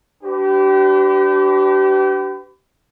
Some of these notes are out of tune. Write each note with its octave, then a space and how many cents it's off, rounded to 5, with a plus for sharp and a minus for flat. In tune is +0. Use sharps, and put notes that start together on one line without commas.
D4 -5 G4 -35 B4 +35